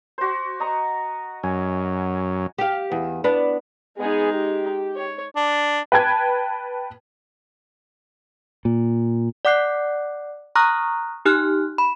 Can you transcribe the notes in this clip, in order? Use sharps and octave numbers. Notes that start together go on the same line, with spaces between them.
F#4 C5
D#5 A#5 C#6
F#2 G#5
G4 F5
E2
B3 D4
G#3 B3 D#4 G#4
G4
C#5
D4
B4 G5 A5 G#6
A#2
D5 F#5 D6 F#6 C7
A#5 C#6 D#6 F6 F#6 A#6
D#4 G4 F6 F#6
B5